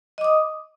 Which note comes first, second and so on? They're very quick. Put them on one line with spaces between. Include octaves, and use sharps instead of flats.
D#5 D6 D#6